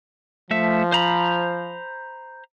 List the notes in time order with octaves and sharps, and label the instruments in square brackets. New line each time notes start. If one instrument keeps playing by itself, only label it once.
[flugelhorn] F3 [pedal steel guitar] A3 E5
[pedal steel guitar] C5 A#5 B5